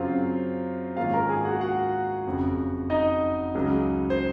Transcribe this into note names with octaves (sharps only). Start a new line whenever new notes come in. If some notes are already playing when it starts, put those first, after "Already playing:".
Already playing: F#2 C#3 F#3 C4 F4 F5
G#2 D#3 A#3 C#4 F4 F5
A#4 A#5
G#4 G#5
F#4 F#5
F#4 F#5
F#1 F2 C#3
D#4 D#5
C#2 C#3 F#3
C5